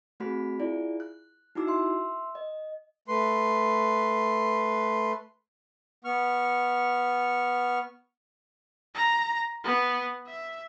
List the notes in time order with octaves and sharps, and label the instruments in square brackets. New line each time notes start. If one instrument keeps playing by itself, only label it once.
[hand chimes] A3 C4 F#4 G#4 B5 B6
E4 F4 G#4 D5
F#6
D#4 E4 F#4 D6 E6
E5 C6 E6
D#5
[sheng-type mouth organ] A3 B4 C6
B3 C#6 F6
[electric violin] A#5
B3
E5